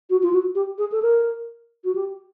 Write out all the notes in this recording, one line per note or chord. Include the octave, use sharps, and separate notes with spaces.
F#4
F4
F#4
G4
G#4
A4
A#4
F#4
G4